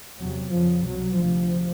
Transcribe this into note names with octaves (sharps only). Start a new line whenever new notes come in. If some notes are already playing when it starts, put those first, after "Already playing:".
E2 C3 F#3
F2 C#3 F3
C2 B2 F#3
D2 C3 F3